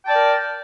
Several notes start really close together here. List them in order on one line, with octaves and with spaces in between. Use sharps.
G5 A5 D5 A#4